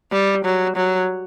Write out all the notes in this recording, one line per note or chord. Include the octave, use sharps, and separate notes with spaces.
G3
F#3
F#3